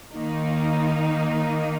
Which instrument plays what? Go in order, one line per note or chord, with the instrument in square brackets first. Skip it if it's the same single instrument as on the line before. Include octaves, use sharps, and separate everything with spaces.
[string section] D#3 A#3 D#4